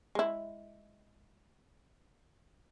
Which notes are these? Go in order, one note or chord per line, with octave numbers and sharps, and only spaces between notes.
G#3 E4